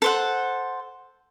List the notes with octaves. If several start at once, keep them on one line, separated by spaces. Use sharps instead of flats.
A4 C5 F#5